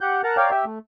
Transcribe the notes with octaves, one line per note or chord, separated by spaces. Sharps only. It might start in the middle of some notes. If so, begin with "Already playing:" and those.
G4 F#5 G6
A#4 F#5 A5 A#5
A#4 C#5 D5 F5 G5
G4 E5 G5
A3